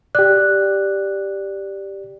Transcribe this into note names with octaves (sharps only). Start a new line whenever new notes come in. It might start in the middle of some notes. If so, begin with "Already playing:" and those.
G4 D5 F#6